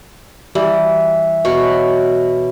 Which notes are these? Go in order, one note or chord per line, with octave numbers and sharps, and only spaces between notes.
E3 G3
B2 C#5